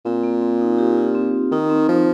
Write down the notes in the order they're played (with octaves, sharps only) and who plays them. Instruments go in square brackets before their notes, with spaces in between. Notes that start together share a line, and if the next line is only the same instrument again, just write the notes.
[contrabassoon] A#2 [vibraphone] C4
[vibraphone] A#3
C4
D#4
G4
F4
C4
[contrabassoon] D#3 [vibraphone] D#4
[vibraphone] C4
[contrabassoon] F3 [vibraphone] D#4